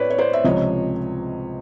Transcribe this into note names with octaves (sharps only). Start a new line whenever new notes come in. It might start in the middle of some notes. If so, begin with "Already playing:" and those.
Already playing: A2 B4 C#5 D5
C#5
C5 D5
E5
C#2 C3 F3 C#5 D#5